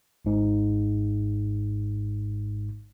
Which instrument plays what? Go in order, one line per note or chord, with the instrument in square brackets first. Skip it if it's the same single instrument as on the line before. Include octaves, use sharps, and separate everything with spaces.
[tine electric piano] G#1 G#2